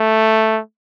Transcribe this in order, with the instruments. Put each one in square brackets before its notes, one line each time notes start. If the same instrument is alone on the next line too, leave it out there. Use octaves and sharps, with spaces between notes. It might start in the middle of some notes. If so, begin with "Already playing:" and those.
Already playing: [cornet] A3